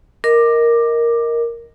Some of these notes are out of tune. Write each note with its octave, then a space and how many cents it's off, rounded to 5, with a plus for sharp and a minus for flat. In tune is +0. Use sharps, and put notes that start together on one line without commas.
A#4 +0 D#5 +15 D6 +15